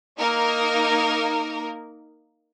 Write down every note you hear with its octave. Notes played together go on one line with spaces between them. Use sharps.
A#3 D#4 A#4